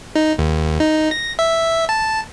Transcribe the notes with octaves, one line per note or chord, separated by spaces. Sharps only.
D#4
D#2
D#4
A#6
E5
A5